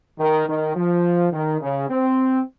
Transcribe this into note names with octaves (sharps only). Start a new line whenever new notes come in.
D#3
D#3
F3
D#3
C#3
C4